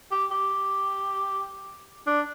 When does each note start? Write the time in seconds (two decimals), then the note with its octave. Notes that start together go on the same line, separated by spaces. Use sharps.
0.12 G4
0.31 G4
2.07 D4